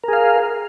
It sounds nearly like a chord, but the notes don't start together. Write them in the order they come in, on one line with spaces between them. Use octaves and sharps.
A#4 G#4 F5